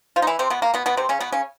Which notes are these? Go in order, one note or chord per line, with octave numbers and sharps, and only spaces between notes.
F3 F4
D#4
E3 E4
C3 C4
B2 B3
A#3
B2 B3
B2 B3
C3 C4
C#3 C#4
B2 B3
C#3 C#4